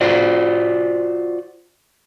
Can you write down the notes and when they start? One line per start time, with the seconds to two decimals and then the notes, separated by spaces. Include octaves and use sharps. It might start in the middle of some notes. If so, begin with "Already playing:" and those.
0.01 F4 F#4 C5 D5